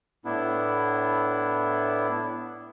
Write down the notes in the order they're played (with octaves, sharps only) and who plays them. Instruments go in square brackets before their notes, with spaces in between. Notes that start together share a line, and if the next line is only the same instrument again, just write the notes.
[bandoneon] A2 B3 D4 E4